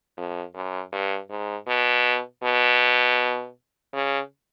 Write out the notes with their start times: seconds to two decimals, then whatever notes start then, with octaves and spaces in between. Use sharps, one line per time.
0.17 F2
0.54 F#2
0.92 G2
1.30 G#2
1.67 B2
2.43 B2
3.93 C#3